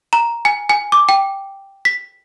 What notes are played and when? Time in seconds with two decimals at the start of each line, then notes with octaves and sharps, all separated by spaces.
0.13 A#5
0.45 G#5
0.69 G#5
0.92 D6
1.09 G5
1.85 B6